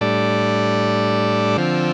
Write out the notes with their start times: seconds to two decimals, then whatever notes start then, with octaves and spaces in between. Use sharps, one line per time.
0.01 A2 G3 D4 A4 D5
1.57 D3 F3 C4